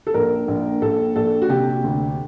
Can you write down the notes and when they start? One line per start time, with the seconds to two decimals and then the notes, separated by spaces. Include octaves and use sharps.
0.07 A4
0.14 A#1 A#4
0.48 A#1
0.82 A#1 A4
1.15 A#1 A4
1.42 F#4
1.50 C3 G4
1.84 D2